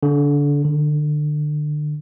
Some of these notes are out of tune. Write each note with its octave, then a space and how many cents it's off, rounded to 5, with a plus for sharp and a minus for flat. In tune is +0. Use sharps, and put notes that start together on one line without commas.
D3 -25
D3 +30